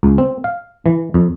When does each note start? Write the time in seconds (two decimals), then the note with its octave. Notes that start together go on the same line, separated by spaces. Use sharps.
0.03 C#2
0.18 C4
0.44 F5
0.86 E3
1.14 F2